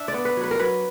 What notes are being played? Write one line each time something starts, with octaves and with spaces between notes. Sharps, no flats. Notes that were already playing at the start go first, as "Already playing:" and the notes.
Already playing: D4 E5
D5
B3
B4
F#3
B4
A#4
F#3 B4